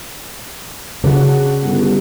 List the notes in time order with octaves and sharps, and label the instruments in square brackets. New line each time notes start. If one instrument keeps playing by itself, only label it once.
[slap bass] C#3 [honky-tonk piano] D4 F#4
[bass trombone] G1